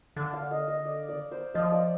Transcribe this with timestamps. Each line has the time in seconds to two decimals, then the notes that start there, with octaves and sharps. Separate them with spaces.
0.16 D3 F5
0.33 F5
0.51 D#5
0.68 D#5
0.85 D5
1.09 D5
1.31 C5
1.54 F3 D#5
1.72 D5